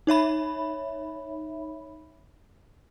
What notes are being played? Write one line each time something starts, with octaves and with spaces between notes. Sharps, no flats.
D#4 C#5 E5 B5